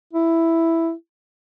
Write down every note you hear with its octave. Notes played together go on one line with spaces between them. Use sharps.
E4